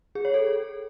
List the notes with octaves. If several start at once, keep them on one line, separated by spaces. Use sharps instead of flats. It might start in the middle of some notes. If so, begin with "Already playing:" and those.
G#4
C#5
A4